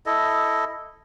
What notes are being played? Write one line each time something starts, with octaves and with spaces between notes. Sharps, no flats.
E4 A4 D#5